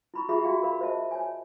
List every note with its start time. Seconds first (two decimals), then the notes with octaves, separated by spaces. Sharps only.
0.14 E4 B5 C#6
0.29 F4 G4 G#4 E5 B5
0.44 F#4 G4 D5 F5 G5
0.63 A#4 F5 B5
0.81 C5 D#5 E5 A5
1.11 C#5 G#5